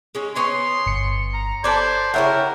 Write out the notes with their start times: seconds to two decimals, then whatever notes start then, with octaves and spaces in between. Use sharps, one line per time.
0.15 G#3 C#4
0.35 B3 C#5 G#5 C6
0.86 G1 C#7
1.34 A#5
1.64 A4 B4 C5 D5 A5 D6 G#6
2.14 C#3 E4 A#4 C#5 E5 F#5 G5